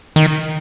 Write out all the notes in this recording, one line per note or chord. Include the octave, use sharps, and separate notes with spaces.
D#3